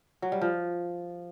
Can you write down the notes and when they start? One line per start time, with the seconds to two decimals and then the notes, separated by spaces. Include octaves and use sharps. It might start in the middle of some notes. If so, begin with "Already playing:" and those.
0.22 F#3
0.32 G3
0.42 F3